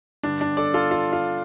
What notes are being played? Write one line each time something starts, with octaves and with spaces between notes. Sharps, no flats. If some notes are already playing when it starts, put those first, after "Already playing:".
G2 D3 G3 D4
D4
A4 D5
F4 A4
F4
F4